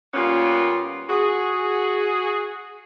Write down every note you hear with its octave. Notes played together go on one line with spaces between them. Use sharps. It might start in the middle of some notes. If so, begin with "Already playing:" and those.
A#2 G3 A#3 B3 C#4 F4
F#4 G#4